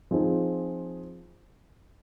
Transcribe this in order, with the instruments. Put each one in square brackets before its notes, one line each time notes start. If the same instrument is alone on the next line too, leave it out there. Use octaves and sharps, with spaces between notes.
[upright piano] F3 C4 D#4 G#4